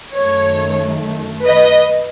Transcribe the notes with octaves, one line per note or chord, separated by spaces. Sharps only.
F#2 D#3 A3 C#5
B4 D#5